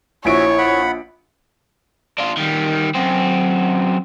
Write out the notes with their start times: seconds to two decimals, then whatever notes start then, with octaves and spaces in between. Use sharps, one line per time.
0.25 A#1 E4 F#4 C#5 E5 G#5 D7
0.58 F#5 B5
2.18 D4 F4
2.37 D#3 G3
2.95 F#2 C4